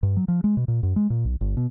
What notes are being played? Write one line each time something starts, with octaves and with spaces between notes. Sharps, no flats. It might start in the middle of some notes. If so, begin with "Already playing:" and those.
G2
F#3
F3
G#3
B2
A#2
F#2
G#3
A#2
B1
G1
B2